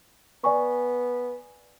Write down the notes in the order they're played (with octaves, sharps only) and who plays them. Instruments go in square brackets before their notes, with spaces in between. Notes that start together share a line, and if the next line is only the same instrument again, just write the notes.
[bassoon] B3 [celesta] D5 G#5 C#6